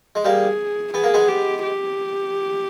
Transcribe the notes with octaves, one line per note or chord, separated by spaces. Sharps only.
G#3
G3 A#3 G#4
B3 G#4
A#3
G#3 B3
G4
G4